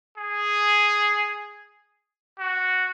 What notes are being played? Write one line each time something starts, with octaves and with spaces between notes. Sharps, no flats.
G#4
F#4